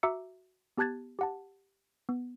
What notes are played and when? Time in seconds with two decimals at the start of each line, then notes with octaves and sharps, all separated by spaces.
0.03 F#4 E5 A#5 D6 E6 C#7
0.77 B3 G4 A5 F#6 G#6 A6
1.19 G4 F#5 A5
2.09 B3